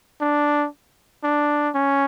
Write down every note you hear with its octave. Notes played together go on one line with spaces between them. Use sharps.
D4
D4
C#4